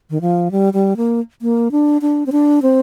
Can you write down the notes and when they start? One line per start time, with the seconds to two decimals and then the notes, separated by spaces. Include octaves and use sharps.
0.10 D#3
0.21 F3
0.51 G3
0.73 G3
0.97 A#3
1.42 A#3
1.71 D4
2.02 D4
2.26 C4
2.32 D4
2.62 C4